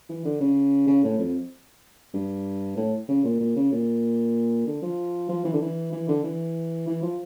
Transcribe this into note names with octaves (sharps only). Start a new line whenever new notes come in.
E3
D3
C#3
C#3
A2
F2
G2
A2
C#3
A#2
A#2
C#3
A#2
D3
F3
F3
E3
D3
E3
E3
D3
E3
E3
F3